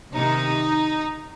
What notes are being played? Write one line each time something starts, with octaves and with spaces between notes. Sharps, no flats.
C3 D#3 D#4